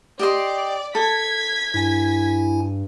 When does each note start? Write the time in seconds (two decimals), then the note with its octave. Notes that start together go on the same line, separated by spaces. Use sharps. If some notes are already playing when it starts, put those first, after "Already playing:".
0.19 G4 D5 D#5 C6
0.95 A4 G#6 B6
1.74 G2 E4 G#5